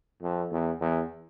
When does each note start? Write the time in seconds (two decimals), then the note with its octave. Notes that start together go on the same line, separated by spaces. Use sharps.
0.22 F2
0.51 E2
0.81 E2